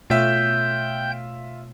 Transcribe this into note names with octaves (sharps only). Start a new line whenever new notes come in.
B2 A3 F4 C#5 E5 G5 G6